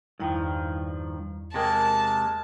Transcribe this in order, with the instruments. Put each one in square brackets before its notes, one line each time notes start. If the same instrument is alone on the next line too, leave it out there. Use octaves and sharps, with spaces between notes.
[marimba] E2 E4 G5 [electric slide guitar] G2 D#3 F3
[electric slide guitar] C3 G#3 A#3 [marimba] A#4 G5 A#6 [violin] A5